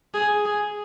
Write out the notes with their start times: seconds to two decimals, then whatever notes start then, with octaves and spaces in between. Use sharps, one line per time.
0.14 G#4
0.45 G#4